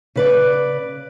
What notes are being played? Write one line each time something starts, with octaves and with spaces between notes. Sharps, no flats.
C#3 B4 D5